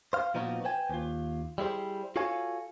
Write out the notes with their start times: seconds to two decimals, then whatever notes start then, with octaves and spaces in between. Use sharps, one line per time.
0.13 C5 F5
0.34 A#2 F3 B3 D#4 F4 F#4
0.64 B4 C5 G5 G#5
0.90 D#2 F4
1.58 G3 E4 G#4 C5
2.16 F4 F#4 A4 C#5 F5 G#5